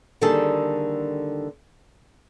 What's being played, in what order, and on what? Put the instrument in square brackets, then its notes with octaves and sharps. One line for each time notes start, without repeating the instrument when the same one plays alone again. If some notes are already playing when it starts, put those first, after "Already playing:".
[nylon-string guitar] D3 D#3 G3 A#3 G#4 A4